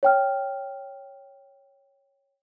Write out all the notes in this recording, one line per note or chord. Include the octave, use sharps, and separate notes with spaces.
C#5 G5 F6